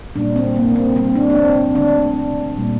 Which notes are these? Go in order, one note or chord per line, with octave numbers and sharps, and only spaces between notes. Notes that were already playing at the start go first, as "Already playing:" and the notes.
A#2 G3 A#3 D4
C4
A#3
C4
A#2 G3 A#3 C4
D4
D4
C4
D3 A3 D4
A#2 G3 A#3